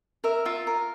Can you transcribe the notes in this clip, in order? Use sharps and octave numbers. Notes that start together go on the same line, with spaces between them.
A#4 E5
F4 E5
A#4